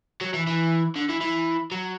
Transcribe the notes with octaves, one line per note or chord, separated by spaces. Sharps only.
F#3
E3
E3
D3
E3
E3
F#3